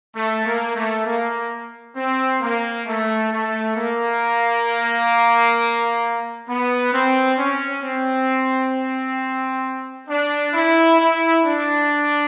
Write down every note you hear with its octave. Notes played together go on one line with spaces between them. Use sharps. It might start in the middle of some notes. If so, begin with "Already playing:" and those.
A3
A#3
A3
A#3
C4
A#3
A3
A3
A#3
B3
C4
C#4
C4
D4
E4
E4
D4